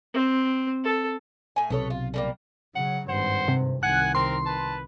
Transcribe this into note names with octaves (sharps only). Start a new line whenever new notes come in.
C4
A4
A2 G#5
B1 C3 B3 A4 C#5
F4
D3 G3 A#3
C#3 F#3 F#5
G#1 G2 C5 F#5
C3
C2 D#3 F#5 G#5 F#6
C4 A#4 C6
B4 A5